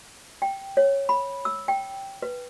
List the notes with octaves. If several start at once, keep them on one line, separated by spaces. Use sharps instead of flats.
G5
C#5
B5
E6
G5
B4